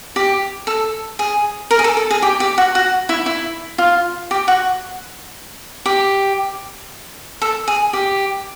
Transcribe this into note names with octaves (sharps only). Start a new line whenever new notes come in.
G4
A4
G#4
A#4
G#4
A4
A4
G#4
G4
G4
F#4
F#4
E4
E4
F4
G4
F#4
G4
A4
G#4
G4